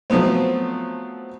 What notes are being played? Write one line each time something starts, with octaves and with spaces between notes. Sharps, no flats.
F3 F#3 A3 B3 C4